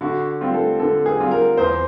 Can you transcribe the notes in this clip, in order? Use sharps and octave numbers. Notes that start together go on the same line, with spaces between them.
D3 F#4
G3 C4 F4
A4
D3 A4
G#4
G3 C4 F4
A#4
E2 C5